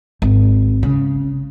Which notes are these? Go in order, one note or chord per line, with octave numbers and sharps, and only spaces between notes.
G#1
C#3